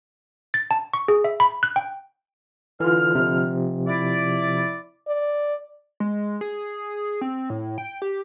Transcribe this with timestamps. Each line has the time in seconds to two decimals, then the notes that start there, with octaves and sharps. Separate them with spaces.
0.54 A6
0.71 A5
0.94 C#6
1.08 G#4
1.24 E5
1.40 B5
1.63 F#6
1.76 G5
2.80 D3 E3 F4 F6
3.15 C3 F3
3.87 E4 D5
5.08 D5
6.00 G#3
6.41 G#4
7.21 C4
7.50 A2
7.78 G5
8.02 G4